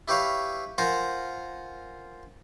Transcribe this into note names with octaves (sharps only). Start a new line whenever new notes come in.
E4 G4 B4 C#5 F5
F4 A#4 C5 F#5 G#5